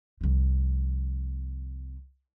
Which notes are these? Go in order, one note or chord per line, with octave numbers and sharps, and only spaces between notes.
C2 F3